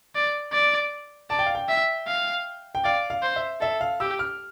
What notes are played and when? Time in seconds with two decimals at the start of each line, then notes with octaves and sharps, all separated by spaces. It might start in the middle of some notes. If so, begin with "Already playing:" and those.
0.15 D5
0.53 D5
1.30 D5 A5
1.39 G5
1.47 F5
1.55 G5
1.69 E5
2.08 F5
2.75 G5
2.84 D5 F5
3.10 F5
3.23 C5
3.36 E5
3.61 A4 E5
3.81 F5
4.00 G4 E6
4.19 F6